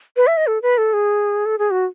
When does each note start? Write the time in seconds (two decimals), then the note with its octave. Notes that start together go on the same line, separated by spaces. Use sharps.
0.17 B4
0.27 E5
0.37 D#5
0.47 A4
0.62 B4
0.78 A4
0.93 G#4
1.46 A4
1.59 G#4
1.71 F#4